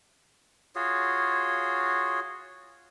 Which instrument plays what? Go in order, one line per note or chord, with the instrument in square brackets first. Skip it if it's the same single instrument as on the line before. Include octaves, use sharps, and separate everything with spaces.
[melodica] F4 F#4 G#4 C#5